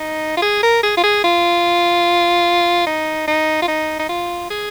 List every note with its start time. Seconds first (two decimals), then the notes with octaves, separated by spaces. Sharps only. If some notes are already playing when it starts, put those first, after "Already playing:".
Already playing: D#4
0.37 F4
0.42 G#4
0.63 A#4
0.83 G#4
0.97 F4
1.03 G#4
1.24 F4
2.87 D#4
3.27 D#4
3.62 F4
3.68 D#4
4.00 D#4
4.09 F4
4.50 G#4